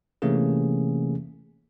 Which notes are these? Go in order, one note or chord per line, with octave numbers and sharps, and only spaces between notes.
C3 E3 A3 A#3 C#4 G#4